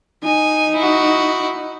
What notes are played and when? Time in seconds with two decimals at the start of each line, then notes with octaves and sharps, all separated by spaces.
0.24 D#4 G#5
0.76 E4 F#4